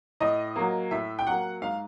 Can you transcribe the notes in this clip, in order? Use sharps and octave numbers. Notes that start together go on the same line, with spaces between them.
A2 D#5
F#3 A#3
A2 E5
G5
F#3 A#3 F#5
G#2 F5